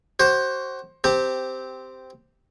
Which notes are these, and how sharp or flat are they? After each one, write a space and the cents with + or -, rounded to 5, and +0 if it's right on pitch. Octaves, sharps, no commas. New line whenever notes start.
F#4 +35 C5 +15
C4 -10 G4 +0 A#5 -45